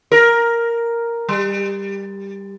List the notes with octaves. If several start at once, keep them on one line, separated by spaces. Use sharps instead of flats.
A#4
G3